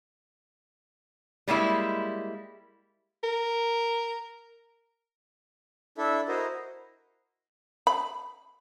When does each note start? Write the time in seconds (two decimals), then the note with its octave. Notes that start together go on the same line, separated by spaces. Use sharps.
1.48 G3 G#3 A#3 E4
3.23 A#4
5.98 D4 E4 A4 E5
6.28 E4 F#4 A#4 C5 D#5
7.87 B5